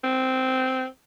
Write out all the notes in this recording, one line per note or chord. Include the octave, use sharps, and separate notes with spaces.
C4